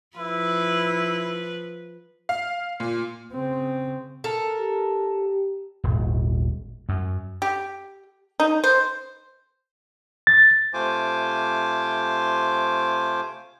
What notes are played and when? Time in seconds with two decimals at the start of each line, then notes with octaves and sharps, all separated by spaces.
0.17 F3 E4 B4
2.29 F5
2.80 A#2
3.32 C#3 C4
4.24 A4 A#4
4.59 G4
5.84 D#1 G#1
6.89 F#2
7.42 G4
8.40 D#4
8.64 C5
10.27 A6
10.74 C3 A3 F4 C5 G#5 D6